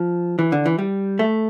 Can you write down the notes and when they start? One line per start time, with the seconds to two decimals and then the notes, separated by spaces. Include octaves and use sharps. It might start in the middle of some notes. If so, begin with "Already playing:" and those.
Already playing: F3
0.39 E3
0.52 D3
0.66 E3
0.79 G3
1.19 A3